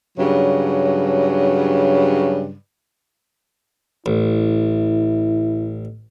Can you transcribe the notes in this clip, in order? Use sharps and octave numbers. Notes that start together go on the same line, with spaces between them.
G2 C#3 F#3
A1 E4